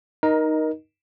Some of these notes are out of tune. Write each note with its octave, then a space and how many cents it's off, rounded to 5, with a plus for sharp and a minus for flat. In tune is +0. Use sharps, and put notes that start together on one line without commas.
D#4 +0 A#4 +20 D#5 +0